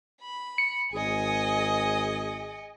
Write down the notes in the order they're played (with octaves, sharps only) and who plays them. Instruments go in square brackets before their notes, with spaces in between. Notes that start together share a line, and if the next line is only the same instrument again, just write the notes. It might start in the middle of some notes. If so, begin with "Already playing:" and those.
[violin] B5
[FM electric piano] C#7
[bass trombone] G#1 [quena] G#4 [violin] D#5 G#5